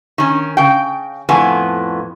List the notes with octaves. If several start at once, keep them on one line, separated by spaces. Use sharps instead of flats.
D#3 C#4
C#3 G5
F2 A2 B3 G#5